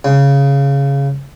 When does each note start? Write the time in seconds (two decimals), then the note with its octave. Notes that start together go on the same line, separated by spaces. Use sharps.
0.05 C#3